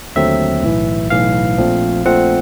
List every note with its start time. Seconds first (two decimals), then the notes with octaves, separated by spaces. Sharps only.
0.16 D#2 D3 F#3 A3 C4 E5
0.63 B1 A2 E3
1.10 B1 A2 E3 F5
1.58 A#1 A#2 F3 A3 C4
2.05 A#1 A#2 F3 A3 C4 F#5